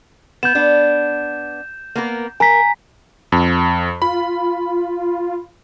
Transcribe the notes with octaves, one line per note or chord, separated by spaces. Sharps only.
B3 G6 E7
B3 D4
A#3 B3 A#4
A#4 G#5 A#5 B6
F2
F4 B5